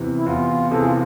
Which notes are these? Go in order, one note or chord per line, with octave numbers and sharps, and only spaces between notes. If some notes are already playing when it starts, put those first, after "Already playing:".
Already playing: E2 C3 E3
E4
E2 F4
C3 E3 G#4 A4
F4